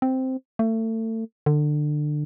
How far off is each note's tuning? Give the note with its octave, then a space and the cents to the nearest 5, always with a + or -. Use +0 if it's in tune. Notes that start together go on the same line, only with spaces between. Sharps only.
C4 -5
A3 +30
D3 +25